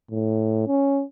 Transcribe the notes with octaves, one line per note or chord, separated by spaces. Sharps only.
A2
C#4